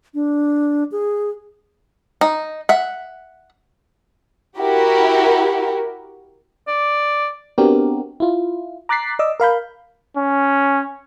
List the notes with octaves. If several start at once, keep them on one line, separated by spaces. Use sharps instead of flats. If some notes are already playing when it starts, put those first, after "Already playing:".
D4
G#4
D#4
E5 F#5
E4 F#4 G4 A#4
D5
B3 C4 D4 F#4 G4 A#4
E4 F4
A#5 D6 F#6 A6 B6 C7
D5 D#5 D6 E6
A#4 F5 B5 G6
C#4